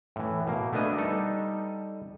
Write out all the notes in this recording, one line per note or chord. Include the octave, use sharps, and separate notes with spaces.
A2 E3
B2 A#3
A3 B3 D4 B4 D#5 G#5
G3 D#4 A4